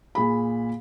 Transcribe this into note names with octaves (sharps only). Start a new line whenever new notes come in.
A#2 G#4 B5